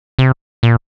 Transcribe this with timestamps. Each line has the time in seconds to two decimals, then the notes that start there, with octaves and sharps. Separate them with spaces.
0.19 C3
0.63 A#2